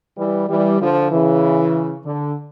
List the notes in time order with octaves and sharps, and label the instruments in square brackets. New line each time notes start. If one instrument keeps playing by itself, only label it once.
[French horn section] E3 G3
E3 G3
D3 F3
C#3 E3
D3